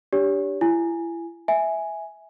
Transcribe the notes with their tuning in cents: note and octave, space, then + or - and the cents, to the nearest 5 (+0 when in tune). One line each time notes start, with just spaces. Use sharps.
D4 +0 G4 +0 C#5 +40
E4 +30 G#5 +0
E5 -10 G#5 +0